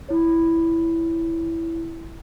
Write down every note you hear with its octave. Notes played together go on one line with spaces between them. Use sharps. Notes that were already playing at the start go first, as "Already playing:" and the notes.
E4 C#5